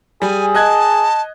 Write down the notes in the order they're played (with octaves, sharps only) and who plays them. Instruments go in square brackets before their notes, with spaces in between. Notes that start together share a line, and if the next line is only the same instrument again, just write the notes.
[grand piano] G3 [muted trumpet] G#4 [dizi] G#5
[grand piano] D#5 F#6 G#6 [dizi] A5